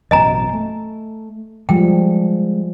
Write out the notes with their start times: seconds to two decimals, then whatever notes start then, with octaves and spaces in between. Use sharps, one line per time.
0.11 A1 F#2 B2 D#5 G#5 A#5
0.53 A3
1.69 F3 G3 G#3 G5